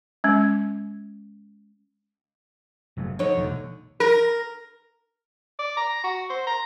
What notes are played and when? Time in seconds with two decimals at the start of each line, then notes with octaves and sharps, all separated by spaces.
0.24 G#3 C#4
2.97 F#1 C#3 A3
3.19 D3 F3 D#4 C#5
3.37 E1 A#1 D#2
4.00 A#4
5.59 D5
5.77 A#5
6.04 F#4
6.30 C5
6.47 A#5